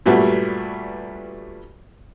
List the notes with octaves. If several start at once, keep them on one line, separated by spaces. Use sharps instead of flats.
G2 A#2 F#3 G3 A3 B3